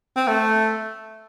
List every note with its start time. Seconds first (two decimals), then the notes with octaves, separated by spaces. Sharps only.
0.16 C4
0.28 A3